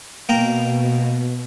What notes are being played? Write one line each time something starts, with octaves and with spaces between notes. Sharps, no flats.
B2 A#3 G5 A#5